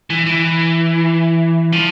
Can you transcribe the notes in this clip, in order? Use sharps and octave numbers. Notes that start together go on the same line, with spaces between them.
E3
E3
F3